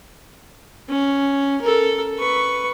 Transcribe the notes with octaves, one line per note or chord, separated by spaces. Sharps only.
C#4
A4 A#4
B4 C#6